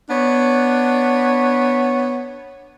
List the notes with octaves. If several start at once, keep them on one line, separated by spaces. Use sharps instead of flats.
B3 D4 C#5